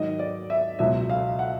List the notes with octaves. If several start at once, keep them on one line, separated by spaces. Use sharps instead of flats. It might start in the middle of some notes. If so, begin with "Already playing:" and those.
Already playing: G#2 D#3 F#3 D#5
D5
E5
C#2 B2 F#3 E5
F5
F#5